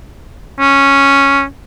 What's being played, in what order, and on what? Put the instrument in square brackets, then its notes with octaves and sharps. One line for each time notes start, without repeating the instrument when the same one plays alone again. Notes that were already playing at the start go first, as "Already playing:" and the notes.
[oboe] C#4